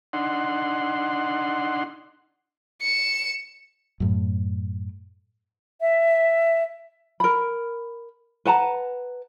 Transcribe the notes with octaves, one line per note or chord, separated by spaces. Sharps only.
D4 D#4 F#5 C6
C#7 E7
F#2 A2
E5
A#4 B5
B4 F#5 A5 A#5